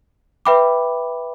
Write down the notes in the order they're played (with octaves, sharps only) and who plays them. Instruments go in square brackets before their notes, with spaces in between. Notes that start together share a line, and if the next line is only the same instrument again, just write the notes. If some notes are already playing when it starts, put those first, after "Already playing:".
[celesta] B4 E5 G5 B5 D6